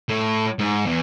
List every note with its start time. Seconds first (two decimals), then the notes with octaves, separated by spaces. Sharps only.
0.09 A2
0.59 G#2
0.86 E2